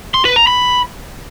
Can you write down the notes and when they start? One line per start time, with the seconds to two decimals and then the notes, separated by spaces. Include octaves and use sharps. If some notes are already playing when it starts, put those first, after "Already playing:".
0.14 C6
0.25 B4
0.36 A#5
0.47 B5